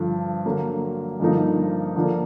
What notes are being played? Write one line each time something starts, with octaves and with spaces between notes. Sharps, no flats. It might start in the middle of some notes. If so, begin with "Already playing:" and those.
Already playing: G2 D3 F3
D3 F#3 A#3
G2 D3 F3 A#3 D#4
D3 F3 A#3 D4